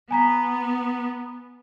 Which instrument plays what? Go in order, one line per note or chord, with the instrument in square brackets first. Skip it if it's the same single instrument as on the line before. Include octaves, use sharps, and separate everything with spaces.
[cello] B3 [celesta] G#5 A#5 B6